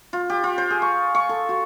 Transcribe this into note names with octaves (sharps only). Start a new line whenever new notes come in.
F4
G4
F4
C5
G#4
C#6
C#6
A4
F#4